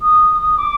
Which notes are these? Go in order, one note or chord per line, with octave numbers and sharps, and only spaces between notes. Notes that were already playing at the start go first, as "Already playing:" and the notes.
D#6
D6